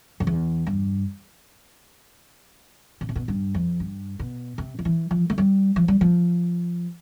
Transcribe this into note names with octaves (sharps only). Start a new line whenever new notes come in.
F2
E2
G2
B2
C3
B2
G2
F2
G2
B2
C3
F3
E3
F3
A3
G3
F3
G3
F3